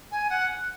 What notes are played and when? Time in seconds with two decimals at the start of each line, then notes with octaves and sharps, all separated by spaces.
0.11 G#5
0.30 F#5